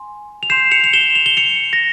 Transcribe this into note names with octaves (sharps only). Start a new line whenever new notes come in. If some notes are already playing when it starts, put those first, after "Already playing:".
Already playing: G#5 C6
F7
C6 G6 C7 E7
C#7 F7
F7
E7 G7
F7
G7
C#7 F7
A#6